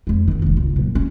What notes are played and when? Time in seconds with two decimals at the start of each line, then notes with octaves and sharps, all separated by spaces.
0.07 F2 G#3
0.28 D#2 D#3
0.42 F1 E2
0.57 C#2
0.76 A#2 F#3
0.95 C#4